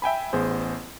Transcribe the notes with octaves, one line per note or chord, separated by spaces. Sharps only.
E5 G5 G#5 B5
A1 B3 G#4 C5